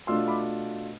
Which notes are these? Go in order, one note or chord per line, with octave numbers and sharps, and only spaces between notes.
B2 A3 D4 F4 C6 E6
B5 D6